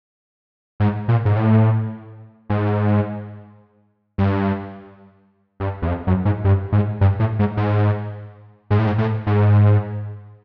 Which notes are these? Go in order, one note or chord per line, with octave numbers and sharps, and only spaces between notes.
G#2
A#2
G#2
A2
G#2
G2
G2
E2
F2
F#2
G#2
G2
G#2
G2
A2
G#2
G#2
G#2
A2
G#2
A2
G#2